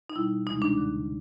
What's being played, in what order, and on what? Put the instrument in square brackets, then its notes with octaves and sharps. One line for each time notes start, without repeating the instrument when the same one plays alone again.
[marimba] D#4
B2 G3 E4
D2 C3 E3 G#3 D#4
D4
D2 D3 F#3